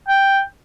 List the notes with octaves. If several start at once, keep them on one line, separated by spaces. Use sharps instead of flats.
G5